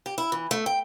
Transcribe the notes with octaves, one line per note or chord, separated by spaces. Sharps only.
G4
E4
E3
A3
G5